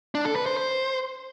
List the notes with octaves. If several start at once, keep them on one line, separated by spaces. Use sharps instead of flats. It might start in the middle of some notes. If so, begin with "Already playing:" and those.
D4
A4
B4
C5
C5